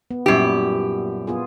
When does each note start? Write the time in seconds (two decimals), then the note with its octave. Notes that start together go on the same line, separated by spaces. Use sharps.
0.11 B3
0.26 F#2 A#2 G3 E4 G4
1.27 B3 F4 G#4